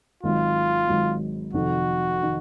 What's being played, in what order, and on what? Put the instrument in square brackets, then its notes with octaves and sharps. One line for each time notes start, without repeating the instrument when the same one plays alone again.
[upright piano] G#1 G#2 F#3 [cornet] F4
[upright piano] G#1 G#2 F#3
[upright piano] F1 F2 D#3 [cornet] F#4
[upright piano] D#3